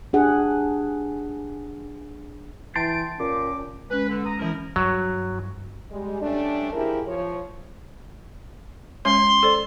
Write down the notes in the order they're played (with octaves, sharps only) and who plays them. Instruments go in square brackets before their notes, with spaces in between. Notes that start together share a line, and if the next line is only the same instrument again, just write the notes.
[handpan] D4 G4 G#4 F#5
[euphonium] E3 [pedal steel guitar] G5 A5 C6 [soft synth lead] D7
[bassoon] A#2 [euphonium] C#4 [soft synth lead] D6
[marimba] G#3 C#4 [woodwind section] B4
[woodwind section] D3
A#5 D#6
[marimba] E3 C#4 [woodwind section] F3 E4 A#4
[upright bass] G2 [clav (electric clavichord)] F#3
[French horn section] G3 G#3
G3 A3 C#4 D4
F3 E4 G4 G#4 A#4
F3 F4 C#5
[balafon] G#3 C#4 C#5 [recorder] C6
[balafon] A4 C5 D5